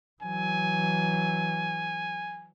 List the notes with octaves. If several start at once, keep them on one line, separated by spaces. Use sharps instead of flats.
E3 F#3 G#5